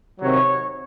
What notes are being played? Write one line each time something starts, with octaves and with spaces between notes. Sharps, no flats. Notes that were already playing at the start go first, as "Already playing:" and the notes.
C3 D#3 F#3 C#5